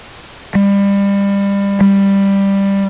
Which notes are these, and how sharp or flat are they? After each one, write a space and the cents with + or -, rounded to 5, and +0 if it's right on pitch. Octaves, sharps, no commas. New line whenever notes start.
G3 +30
G3 +10